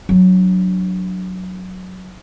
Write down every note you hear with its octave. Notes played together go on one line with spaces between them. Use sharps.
F#3 D4